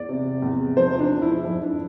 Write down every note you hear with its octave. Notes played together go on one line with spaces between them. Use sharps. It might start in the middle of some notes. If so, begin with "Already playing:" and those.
Already playing: E2 D5
C3
E2
F3 C5
D4
F3
E4
F2 E4
D4